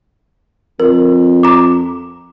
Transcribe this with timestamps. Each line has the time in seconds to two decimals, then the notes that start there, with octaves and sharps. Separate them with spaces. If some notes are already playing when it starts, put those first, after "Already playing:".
0.80 F2 A#4
1.43 A#5 D6